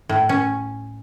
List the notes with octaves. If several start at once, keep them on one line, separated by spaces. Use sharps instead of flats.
A2
C#4